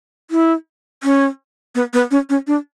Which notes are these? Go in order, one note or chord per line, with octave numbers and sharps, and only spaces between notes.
E4
C#4
B3
B3
C#4
C#4
D4